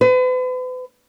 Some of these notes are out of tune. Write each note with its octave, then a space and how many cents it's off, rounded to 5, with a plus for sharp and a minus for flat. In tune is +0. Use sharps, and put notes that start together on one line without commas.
B4 +40